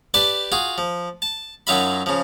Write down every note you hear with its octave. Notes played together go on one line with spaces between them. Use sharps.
G4 B4 D5 G5 A5
F4 F#4 G#4
F3
A5
F#2 F#3 D#4 F4 E5 B5
C#3 F3